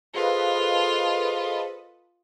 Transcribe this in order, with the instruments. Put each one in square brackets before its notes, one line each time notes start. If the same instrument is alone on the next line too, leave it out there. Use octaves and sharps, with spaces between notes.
[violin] F4 [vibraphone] G#4 C5 F5 [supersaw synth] A4 B4 D#5